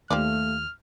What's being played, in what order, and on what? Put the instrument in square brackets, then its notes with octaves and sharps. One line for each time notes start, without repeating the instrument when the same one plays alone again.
[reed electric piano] D#2 [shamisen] F3 G4 D5 [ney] A3 [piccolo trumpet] F6